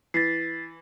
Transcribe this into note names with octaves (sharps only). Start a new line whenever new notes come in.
E3 A6 B6 C7